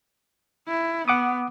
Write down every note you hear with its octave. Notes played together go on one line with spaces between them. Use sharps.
E4
B3 F#5 D6 D#6